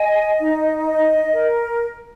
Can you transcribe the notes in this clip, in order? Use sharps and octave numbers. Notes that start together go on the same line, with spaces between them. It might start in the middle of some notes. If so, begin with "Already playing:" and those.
Already playing: D#5 G#5
D#4
D#5
A#4